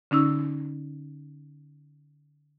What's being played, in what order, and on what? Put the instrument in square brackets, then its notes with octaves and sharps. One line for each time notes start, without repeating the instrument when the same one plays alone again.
[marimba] D3 C#4 D#4 E6